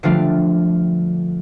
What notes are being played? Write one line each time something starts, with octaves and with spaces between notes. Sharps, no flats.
D3 F3 G3 A3 D4 F4